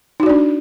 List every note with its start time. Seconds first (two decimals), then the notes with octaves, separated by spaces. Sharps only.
0.20 D#4
0.23 F#4
0.26 D5
0.30 D4